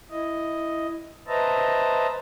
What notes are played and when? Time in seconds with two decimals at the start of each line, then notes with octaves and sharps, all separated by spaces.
0.11 E4 D#5
1.28 B4 C5 D#5 E5 A5 A#5